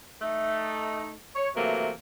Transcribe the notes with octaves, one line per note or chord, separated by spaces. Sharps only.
A3 D#4
C#5
C3 E3 F#3 A3 A#3